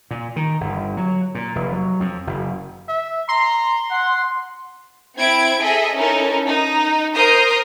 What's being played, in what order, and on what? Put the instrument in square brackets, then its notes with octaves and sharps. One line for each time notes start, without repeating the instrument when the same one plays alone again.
[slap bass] A#2
D#3
G1
F#3
A#2
F1
F#3
F2
F#1
[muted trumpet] E5
[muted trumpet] A#5 [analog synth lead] C6
[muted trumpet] F#5
[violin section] C4 E4 G#6 D7
G#4 A4 D#5 E5
C#4 D#4 E4 A4 A#4
D#4
A#4 C5 D#6 G6 A#6 C7